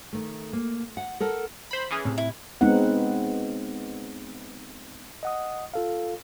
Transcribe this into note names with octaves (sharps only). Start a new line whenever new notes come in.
D#3 A3
A#3
F#5
A4 A#4 F#5 A5
C5 B5
E3 C#4 G#4
A2 C3
E4
G#3 B3 C4 D#4 F#5
D#5 F#5 D#6
F4 A4 F5